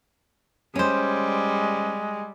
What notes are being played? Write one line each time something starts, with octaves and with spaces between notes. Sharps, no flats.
G3 G#3 C#4 C5